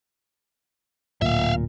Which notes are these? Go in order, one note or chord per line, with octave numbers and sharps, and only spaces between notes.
D1 A#2 E5 F5